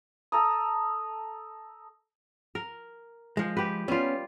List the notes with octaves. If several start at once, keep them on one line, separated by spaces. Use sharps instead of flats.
A4 A#5 D#6
A#4
F3 G#3
G4 B4
G3 B3 C#4 F4